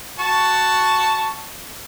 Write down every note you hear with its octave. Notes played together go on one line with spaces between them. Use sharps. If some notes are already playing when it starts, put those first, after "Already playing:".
F#4 A5 C#6